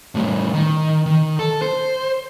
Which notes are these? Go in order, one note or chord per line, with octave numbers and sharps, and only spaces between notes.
A2 G3
D#3
D#3
A4
C5